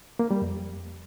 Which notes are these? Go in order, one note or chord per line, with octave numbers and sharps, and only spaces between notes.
A#3
G3
F2